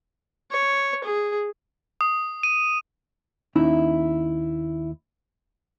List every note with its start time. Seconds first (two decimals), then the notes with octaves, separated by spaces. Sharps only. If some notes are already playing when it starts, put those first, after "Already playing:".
0.51 C#5
1.04 G#4
2.01 D#6
2.43 D#7
3.55 D#2 C#4 D#4 E4 E5